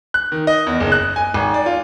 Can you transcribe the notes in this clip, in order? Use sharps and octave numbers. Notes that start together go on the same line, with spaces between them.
F#6
D#3
D#5
E2
F#1
F#6
G#5
G#1
D5
F4